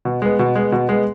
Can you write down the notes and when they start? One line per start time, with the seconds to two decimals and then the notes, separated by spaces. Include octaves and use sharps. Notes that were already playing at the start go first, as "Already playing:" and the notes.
0.05 B2
0.22 G#3 B3
0.39 B2
0.55 G#3 B3
0.72 B2
0.89 G#3 B3